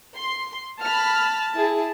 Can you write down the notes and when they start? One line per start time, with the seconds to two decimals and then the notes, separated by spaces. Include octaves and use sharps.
0.17 C6
0.82 A5 B5 F6
1.56 E4 G#4 A5